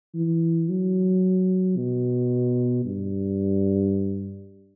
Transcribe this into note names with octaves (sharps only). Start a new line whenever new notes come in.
E3
F#3
B2
G2